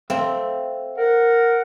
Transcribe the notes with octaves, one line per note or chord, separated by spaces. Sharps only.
C4 A4 E5 F5
A#4 F#5